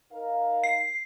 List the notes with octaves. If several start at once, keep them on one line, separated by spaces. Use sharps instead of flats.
D#4 A#4 F5
C7